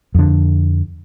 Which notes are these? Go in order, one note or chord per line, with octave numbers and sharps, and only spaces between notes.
F2 D3